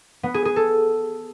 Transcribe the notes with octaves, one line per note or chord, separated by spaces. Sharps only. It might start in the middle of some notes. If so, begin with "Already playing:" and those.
B3
G#4
G#4
A4